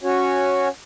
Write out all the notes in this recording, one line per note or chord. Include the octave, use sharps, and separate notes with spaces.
C#4 F#4 C#5